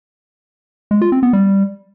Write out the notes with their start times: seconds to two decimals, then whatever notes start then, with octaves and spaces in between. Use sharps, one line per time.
0.91 G#3
1.01 F4
1.12 C4
1.23 B3
1.33 G3